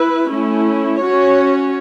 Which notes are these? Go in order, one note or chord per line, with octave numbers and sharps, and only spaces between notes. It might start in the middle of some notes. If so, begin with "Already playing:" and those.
Already playing: E4 B4
A3 C#4 E4
C#4 F#4 C#5